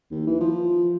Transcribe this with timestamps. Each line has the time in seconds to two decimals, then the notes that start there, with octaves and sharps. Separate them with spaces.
0.11 D#2
0.27 E3
0.40 F3